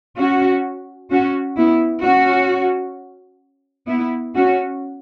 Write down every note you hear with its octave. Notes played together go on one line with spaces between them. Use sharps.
C#4 F#4
C#4 F#4
B3 E4
C#4 F#4
B3 E4
C#4 F#4